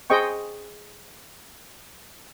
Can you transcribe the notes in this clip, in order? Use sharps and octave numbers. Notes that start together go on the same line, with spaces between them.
G#4 C5 D#5 G5 C#6